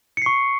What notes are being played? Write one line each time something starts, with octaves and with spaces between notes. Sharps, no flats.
C#6 C7 C#7